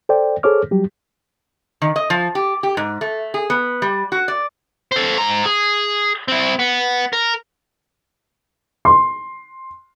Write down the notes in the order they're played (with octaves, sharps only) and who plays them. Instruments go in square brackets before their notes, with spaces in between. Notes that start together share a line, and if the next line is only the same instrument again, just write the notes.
[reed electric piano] A4 C5 D5 G5
G#4 A4 C5 C#5 D6 F6
F#3 G3 G4
[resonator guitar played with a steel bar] D#3
D#5
F3
G4
G4
G#2
A3
G#4
B3
G3
F#4
D5
[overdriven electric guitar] A4 C5
G#2 A#5
G#4
C4 E4
B3
A#4
[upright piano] C6